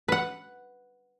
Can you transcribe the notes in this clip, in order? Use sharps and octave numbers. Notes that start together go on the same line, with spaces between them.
B4 F#5